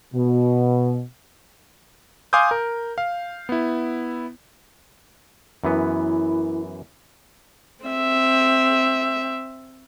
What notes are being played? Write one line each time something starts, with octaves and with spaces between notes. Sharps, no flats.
B2
F5 G#5 C6 D6 D#6 G6
A#4
F5
B3 E4
F#2 E3 B3 E4
C4 E5